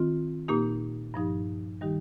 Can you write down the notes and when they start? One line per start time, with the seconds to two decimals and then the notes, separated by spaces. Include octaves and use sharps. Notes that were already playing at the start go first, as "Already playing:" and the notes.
Already playing: D#3 C4 F4
0.48 A#2 A#3 D#4 G4
1.14 G2 F3 D#4 G4
1.81 D#3 G3 D#4 G4